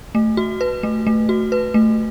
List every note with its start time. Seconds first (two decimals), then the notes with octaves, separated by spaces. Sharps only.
0.15 A3
0.37 F#4
0.61 B4
0.83 A3
1.07 A3
1.29 F#4
1.52 B4
1.74 A3